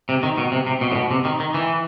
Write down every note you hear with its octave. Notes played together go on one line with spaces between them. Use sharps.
C3
D#3
B2
C3
C3
B2
A2
B2
C3
D#3
D#3
E3